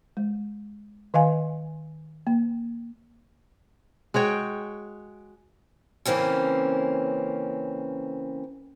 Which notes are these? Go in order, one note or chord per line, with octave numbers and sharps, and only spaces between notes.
G#3
D#3 D#5 F5 G#5
A#3
G#3 F#4 C#5 G5
C#3 E3 A#3 C4 C#4